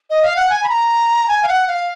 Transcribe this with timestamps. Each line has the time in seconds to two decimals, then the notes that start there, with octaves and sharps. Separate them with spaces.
0.10 D#5
0.23 F5
0.36 F#5
0.50 G#5
0.63 B5
0.69 A#5
1.28 G#5
1.43 F5
1.48 F#5
1.68 F5